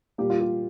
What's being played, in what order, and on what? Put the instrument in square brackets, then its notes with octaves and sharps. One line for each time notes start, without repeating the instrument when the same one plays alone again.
[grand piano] A#2 G3 A#3 G4
F4
G4